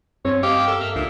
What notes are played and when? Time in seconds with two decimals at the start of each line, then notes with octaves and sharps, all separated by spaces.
0.25 G2 C4 C#5
0.43 G4 D#5 F5
0.67 A4 A#4 E6
0.81 A#3 E5
0.96 C#2 A#2